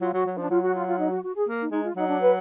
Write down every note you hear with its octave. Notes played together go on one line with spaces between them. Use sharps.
F#3 F4
F#3 F#4
F#3
F3 D4
F#3 F4
F#4
F4
F4
D#4
F#4
F#4
G#4
A#3
D#4
G#3 D#4
F4
F#3 D#4
D4
B4